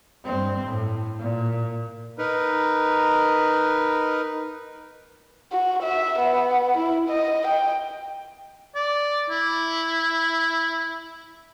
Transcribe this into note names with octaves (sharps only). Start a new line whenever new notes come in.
G2 C4
A2
A#2
D#4 A#4 B4
F#4
E5
B3
E4
D#5
G5
D5
E4